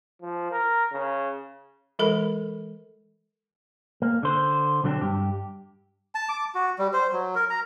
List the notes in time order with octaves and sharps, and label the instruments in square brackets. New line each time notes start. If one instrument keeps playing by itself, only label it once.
[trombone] F3
A#4
C#3
[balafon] E3 G#3 A4 A#4 B5
[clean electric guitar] A#3
D3 C5
B1 D3 F#3 G3 C4 D4
G2 G4
[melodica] A5
D6
F#4
G3
C5
F#3
A#4
A#5